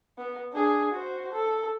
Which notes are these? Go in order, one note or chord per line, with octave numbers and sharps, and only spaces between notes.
B3
D4 G#4
F#4 C5
A4